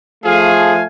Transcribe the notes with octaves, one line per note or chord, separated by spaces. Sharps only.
F3 A3 G#4 F5 G#5